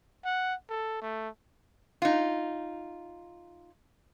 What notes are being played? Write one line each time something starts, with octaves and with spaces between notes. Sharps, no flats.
F#5
A4
A3
D#4 F4